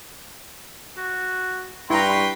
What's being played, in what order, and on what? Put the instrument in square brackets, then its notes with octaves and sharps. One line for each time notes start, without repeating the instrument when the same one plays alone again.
[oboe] F#4
[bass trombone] G2 [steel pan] E4 A#5 [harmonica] B4 G5 C6 [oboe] C#6